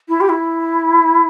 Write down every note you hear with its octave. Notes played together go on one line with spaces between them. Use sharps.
E4
G4
E4